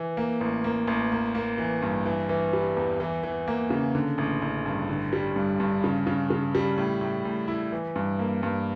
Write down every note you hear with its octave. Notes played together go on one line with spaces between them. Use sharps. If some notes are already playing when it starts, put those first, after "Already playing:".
Already playing: E3
A#3
A1
A#3
A1
A#3
A#3
E3
G2
E3
E3
G3
E2
E3
E3
A#3
C#3
D3
A1
A1
G2
D3
G3
G2
G2
C#3
C#3
C#3
G3
A2
A2
A2
E4
E3
G2
A#3
G2